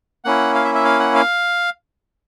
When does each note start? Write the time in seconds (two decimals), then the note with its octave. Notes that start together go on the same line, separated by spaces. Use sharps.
0.24 A#3 C#4 E4 F#5
0.55 F5
0.65 E5
0.75 E5
0.85 F5
1.00 F#5
1.15 F5